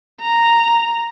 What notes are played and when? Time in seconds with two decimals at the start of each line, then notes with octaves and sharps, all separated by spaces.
0.21 A#5